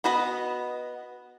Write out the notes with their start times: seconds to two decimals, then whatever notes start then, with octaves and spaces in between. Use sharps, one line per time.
0.04 B3 F#4 B4 D#5